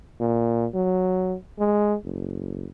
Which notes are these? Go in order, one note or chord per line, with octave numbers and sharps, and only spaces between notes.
A#2
F#3
G#3
F#1